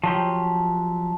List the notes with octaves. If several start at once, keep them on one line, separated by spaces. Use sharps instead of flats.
F3 F#3 G4